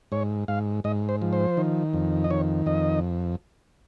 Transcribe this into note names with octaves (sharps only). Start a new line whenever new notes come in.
G#2 C#5
G#2 F5
G#2 D#5
C5
F3
C5
D#3
F2
D#5
D#3 C#5
F2 D#5